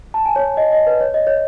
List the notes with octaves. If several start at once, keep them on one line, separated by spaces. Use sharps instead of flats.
A5
G#5
C#5
D#5
D#5
B4
C#5
D#5
C#5